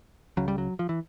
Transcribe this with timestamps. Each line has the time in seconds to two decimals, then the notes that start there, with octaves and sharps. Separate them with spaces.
0.37 C#2 C#3 F#3
0.48 G3
0.58 F#3
0.79 F3
0.89 E3